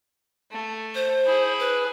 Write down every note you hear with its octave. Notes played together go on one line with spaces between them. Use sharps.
A3
C5
E4 G#4
B4